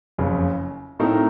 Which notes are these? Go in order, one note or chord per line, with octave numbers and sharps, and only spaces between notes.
F#1 F2 C#3
A2 A3 C4 D#4 A#4